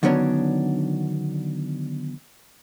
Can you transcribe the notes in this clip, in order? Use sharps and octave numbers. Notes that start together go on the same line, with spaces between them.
D3 D#3 F#3 B3 C#4 D4